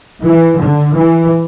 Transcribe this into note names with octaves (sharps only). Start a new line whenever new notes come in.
E3
D3
E3